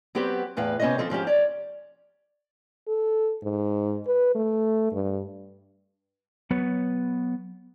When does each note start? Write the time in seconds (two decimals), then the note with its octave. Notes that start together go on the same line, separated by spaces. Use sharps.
0.15 F#3 B3 C4 G4 B4
0.57 E2 A2 B4 F5
0.80 C3 B3 C#4 C5 C#5 D#5
0.98 F3 C4 A4
1.10 G#2 F3 C#4 G4
1.27 C#5 D5
2.87 A4
3.43 G#2
4.07 B4
4.35 A3
4.92 G2
6.51 F#3 B3 B4 C#5